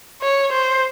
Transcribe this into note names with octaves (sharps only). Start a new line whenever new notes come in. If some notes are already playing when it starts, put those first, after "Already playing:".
C#5
C5